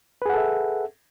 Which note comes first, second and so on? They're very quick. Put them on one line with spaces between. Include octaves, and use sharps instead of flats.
B4 G#4 F#5 A4 E5